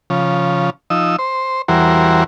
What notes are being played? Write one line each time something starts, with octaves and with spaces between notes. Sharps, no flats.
C#3 F3
F3 D#4 E6
C5
E2 E3 G3 F#4 A#4 C5